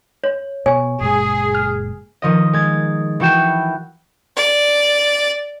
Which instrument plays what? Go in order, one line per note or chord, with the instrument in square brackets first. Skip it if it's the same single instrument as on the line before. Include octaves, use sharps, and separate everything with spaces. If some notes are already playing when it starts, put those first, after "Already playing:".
[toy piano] C#5
[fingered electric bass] B2 [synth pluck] C#5 C#6 [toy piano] G#5
[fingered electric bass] F#1 A#2 G#3 [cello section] G#4
[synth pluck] F6
[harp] D#3 F3 D#5
G#3 G#6 A6
E3 E4 F#4 G5 G6 E7
[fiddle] D5